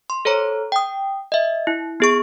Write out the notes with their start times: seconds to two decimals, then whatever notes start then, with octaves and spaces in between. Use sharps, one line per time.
0.10 C6
0.25 A4 C5 C#5 A#5
0.72 G5 D#6
1.32 D#5 E5
1.67 E4
2.00 B3 G#4 C#6